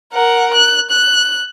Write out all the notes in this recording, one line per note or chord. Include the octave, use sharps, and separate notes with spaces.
A#4 F#5
F#6
F#6